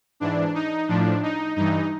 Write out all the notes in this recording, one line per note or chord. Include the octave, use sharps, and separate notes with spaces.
G#2 E3 D4
D#4
A2 F3 D4
D#4
G2 E3 D#4